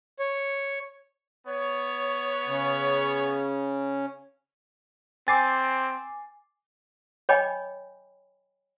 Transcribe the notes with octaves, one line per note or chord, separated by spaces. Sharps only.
C#5
B3 C#5
C#3
C4 G#5 D6 A6 C7
C#5 D#5 G5 G#5 B5 D6